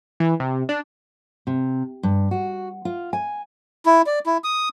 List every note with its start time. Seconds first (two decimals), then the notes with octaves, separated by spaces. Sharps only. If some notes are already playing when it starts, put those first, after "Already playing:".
0.20 E3
0.40 C3
0.69 D4
1.47 C3
2.03 G2
2.31 F#4
2.85 F4
3.13 G#5
3.86 E4
4.06 D5
4.26 E4
4.44 D#6